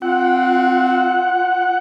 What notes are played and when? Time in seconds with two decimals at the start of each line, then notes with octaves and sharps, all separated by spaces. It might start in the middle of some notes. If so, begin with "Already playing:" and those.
0.02 C4 F4 F#5